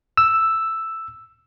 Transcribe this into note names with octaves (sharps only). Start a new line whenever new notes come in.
E6